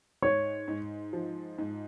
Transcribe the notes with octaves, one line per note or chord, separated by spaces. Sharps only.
G#2 C#5
G#2
F3
G#2